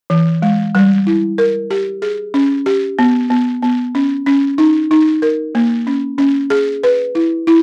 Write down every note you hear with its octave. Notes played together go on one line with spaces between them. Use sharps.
E3
G#3
G3
E4
A#4
G4
G#4
C#4
G4
B3
B3
B3
C#4
C#4
D#4
D#4
A#4
A#3
C#4
C#4
G#4
B4
E4
E4